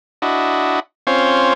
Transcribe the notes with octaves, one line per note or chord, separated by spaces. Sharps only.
D4 E4 F#4 D#5
C4 C#4 F4 C5 C#5